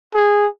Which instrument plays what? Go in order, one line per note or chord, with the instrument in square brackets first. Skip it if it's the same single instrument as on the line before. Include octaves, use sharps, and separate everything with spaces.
[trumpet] G#4